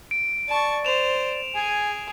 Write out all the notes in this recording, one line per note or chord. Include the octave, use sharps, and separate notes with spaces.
D7
D5 A5 C#6
C5 E7 F7
G#4 G#5